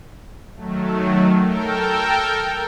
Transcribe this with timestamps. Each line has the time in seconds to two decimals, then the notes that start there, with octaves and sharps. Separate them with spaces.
0.55 D#3 F#3 A3
1.40 A4 A#4 G5